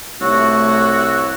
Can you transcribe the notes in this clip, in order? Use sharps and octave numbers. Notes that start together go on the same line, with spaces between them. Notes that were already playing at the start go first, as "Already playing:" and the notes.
C2 A3 F#4 C#5 E6